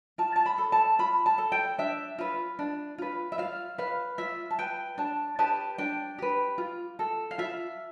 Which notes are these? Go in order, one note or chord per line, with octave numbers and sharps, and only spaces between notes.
F4 A5
A5
B5
A4
A5
F4 B5
A5
A4
G5
D4 E5
F4 B4
D4
F4 B4
E5
F4 F5
B4 F5
F4 E5
A5
B4 G5
D4 A5
G4 B4 A5
D4 G5
G4 B4
F4
A4
F5
F4 E5